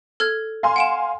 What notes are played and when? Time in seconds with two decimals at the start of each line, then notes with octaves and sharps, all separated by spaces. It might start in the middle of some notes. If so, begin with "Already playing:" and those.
0.20 A4 F6 G#6
0.63 F5 G#5 C6
0.76 F#5 D7 E7